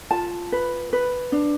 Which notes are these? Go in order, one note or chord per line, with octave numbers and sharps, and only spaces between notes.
F4 A5
B4
B4
D4